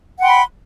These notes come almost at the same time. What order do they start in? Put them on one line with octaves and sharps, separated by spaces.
F#5 G5 C6 B5